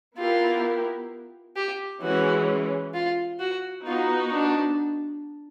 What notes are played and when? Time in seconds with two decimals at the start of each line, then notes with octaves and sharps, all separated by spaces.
0.18 B3 E4 F4 G4 A#4
1.56 G4
2.02 E3 G#3 C#4 F#4
2.94 F4
3.40 F#4
3.86 B3 D#4 F4 F#4
4.32 D4